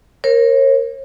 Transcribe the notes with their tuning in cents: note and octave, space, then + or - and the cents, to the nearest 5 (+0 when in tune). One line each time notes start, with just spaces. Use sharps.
A#4 +0 C#5 -40